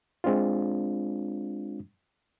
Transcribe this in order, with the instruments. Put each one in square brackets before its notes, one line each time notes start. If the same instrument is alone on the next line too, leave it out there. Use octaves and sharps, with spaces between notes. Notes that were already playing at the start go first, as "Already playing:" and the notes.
[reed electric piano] G#3 C4 D4 F4